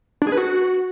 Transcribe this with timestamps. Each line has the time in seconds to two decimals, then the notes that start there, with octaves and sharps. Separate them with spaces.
0.22 D4
0.27 G#4
0.32 B4
0.37 F#4